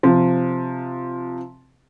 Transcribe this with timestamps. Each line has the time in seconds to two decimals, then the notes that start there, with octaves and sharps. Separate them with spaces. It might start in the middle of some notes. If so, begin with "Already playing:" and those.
0.03 C3 F3